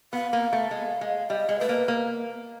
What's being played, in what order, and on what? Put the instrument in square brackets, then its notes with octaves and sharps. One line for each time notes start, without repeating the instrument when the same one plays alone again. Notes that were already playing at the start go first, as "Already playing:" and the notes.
[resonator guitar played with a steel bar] B3 [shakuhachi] F5
[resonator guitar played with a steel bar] A#3
A3
G#3
G#3
[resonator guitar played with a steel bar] G3 [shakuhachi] D#5
[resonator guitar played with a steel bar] G#3
[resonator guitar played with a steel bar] A3 [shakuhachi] B4
[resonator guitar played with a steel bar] A#3
A#3